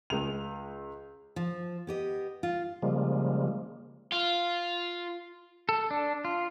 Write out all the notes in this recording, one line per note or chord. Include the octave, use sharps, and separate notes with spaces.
C#2 F7
F3
B3 G4 D#5
F4
C#3 F3 G3 G#3 A#3
F4
A4
D4
F4